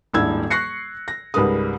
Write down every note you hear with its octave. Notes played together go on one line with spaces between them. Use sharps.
D#1 G#2 D4 E4 E6 G#6
C#6 F#6 A#6 C7 C#7
A#6
C#2 G#2 G3 A#4 B4 D#6